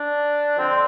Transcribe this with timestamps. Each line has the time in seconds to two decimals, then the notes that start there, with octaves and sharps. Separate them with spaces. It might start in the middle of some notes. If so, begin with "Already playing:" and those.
Already playing: D4
0.56 F2 D3 F3 C4